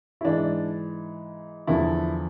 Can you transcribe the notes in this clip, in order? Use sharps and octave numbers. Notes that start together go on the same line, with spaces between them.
E4
G#2 E3 D4
E2 D3 F3 E4